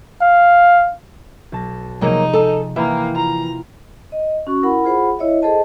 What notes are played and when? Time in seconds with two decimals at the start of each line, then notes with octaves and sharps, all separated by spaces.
0.22 F5
1.52 B1 A5 A#6
2.01 C3 F3 F#3 A#3 D#4 G#4
2.33 A4 G#5
2.76 E3 A#3 E5 G5 A#5
3.16 F4 A#5
4.12 D#5
4.47 C#4 F#4 C#6
4.62 E4 A#4 F#5 B5
4.84 F4 G#4 C5 F#5 B5
5.19 E4 C#5 D#5 E5
5.42 G#4 A4 C5 D#5 A5